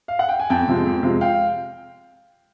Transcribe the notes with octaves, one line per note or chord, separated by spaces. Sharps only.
F5
F#5
G5
G#5
F2 G5 A5
C3 F3 G#3
F2
C3 F3 G#3
F5 G5